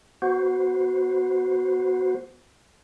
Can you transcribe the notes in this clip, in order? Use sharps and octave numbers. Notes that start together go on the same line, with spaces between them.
B3 F#4 C5